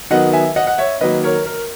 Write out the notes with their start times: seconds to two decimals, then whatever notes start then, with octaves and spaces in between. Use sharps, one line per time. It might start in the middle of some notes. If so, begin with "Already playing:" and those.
0.10 D#3 F#3 B3 D#5 F#5
0.33 E5 G#5
0.56 D#5 F#5
0.67 F#5
0.78 C#5 E5
1.01 D#3 F#3 A#3 B4 D#5
1.24 A#4 C#5
1.46 A#4